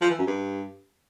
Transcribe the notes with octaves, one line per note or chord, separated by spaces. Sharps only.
F3
E3
F#2
G2